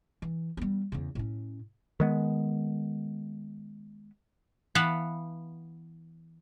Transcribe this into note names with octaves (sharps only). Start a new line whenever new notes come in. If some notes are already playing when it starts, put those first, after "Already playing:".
E3
G3 B3
E2 C#3
A2 C#4
D#3 G#3 B3
E3 B3 B4 F5 F#5 A5